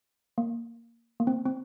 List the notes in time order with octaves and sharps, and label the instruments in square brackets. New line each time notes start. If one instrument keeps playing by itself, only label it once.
[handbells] A#3
A#3
C4
C4